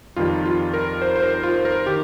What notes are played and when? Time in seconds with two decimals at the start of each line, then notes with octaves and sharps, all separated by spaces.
0.16 F2 D#3 G3 F4
0.45 F4
0.74 A#4
1.02 C5
1.16 C5
1.23 A#4
1.43 F4
1.65 A#4
1.86 D#3 G4